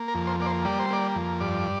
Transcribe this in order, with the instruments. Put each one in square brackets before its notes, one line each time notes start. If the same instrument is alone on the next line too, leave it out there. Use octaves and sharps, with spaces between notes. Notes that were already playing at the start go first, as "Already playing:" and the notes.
Already playing: [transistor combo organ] A#3
A#4
F2
C5
A#3 D5
C5
G3 D5
C5
A#3 D5
F2
G2 D5